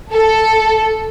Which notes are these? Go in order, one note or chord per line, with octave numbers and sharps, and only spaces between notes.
A4